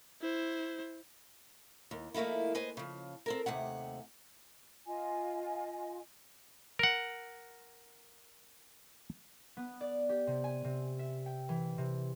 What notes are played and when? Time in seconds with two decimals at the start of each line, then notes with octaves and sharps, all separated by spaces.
0.21 E4 C5
1.91 D#2
2.14 F3 A3 A#3 D#4 E4
2.55 B4 C5 D#5 G#5
2.77 C#3 F3
3.26 C4 A4 A#4
3.46 D#2 C3 A3 F#5
4.87 F4 D#5 G#5
6.79 A#4 F#5
9.57 B3
9.81 D5
10.09 G4
10.27 C3
10.44 G#5
10.64 C3
10.99 E5
11.26 G5
11.49 E3
11.78 C3